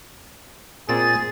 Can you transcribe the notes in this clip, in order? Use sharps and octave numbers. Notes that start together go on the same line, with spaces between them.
A#2 A#3 C4 G#4 A6